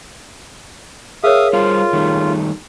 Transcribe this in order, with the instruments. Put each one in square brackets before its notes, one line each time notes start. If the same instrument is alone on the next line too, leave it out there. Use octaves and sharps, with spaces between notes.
[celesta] G#4 A#4 C#5 [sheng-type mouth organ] E5 F5 D#6
[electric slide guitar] G3 C5 F5 [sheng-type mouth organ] F4
[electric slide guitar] D#3 G3 A3